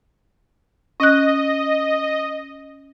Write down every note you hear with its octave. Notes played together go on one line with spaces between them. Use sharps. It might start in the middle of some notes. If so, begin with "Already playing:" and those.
C#4 D#5 F#6